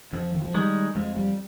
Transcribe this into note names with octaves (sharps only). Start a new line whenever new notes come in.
F2 F3
D#3
F3
D#3 G3 G#3
F2 G#3
G3